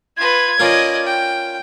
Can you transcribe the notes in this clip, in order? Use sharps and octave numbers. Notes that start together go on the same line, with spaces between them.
F4 B4 G#6
C#4 F4 A#4 D5 D#5
G5